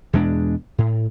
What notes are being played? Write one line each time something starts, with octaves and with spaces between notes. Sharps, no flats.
E2 B2 G#3 D4
A2